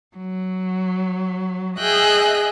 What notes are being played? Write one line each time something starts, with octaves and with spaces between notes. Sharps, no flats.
F#3
G#4 D#5 E5 G5 F#6